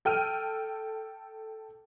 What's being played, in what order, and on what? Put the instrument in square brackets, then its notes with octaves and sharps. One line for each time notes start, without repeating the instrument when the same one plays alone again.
[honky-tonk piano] A4 G5 F6 D#7